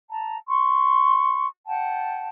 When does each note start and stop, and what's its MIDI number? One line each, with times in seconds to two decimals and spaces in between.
0.10 0.37 81
0.10 0.37 82
0.48 1.46 84
0.48 1.46 85
1.67 2.29 78
1.67 2.29 79
1.67 2.29 81